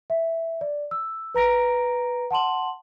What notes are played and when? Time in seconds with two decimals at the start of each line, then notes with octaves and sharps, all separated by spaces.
0.10 E5
0.61 D5
0.91 E6
1.35 B4 A#5 A#6 D7
2.31 F#5 A5 C6 F#7